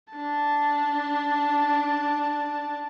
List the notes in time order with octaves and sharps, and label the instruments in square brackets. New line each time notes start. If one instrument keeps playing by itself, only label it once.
[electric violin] D4 A5